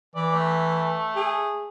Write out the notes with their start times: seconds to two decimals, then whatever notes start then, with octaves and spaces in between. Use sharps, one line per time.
0.16 E3 D5
0.33 A3
1.16 G#4